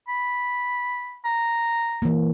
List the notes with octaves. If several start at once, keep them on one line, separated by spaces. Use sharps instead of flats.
B5
A#5
E3 A#3